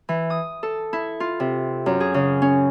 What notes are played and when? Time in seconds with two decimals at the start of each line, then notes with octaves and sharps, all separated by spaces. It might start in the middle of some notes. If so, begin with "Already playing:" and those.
0.09 E3
0.30 D#6
0.63 A4
0.93 E4
1.20 F4
1.40 C3
1.86 F#2
2.00 G#4
2.14 C#3
2.42 C#4